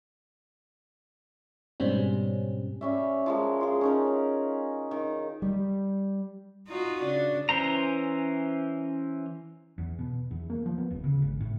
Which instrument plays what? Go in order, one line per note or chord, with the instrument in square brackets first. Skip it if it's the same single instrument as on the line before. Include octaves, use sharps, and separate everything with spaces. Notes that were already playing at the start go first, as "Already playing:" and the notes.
[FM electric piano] G#2 B2 G3 C4 C#4
[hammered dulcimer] G3 C#4 E5
F3 G#3 A#4
F4 G#4
C#4 D#4 A#4
D#3
[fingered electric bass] G3
[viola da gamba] D#4 F4 F#4
C#3 D4
[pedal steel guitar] E3 C#4 C5 A#5
[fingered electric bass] E2
B2
E2
A#3
F3
B3
D#1
C#3
G#1
A2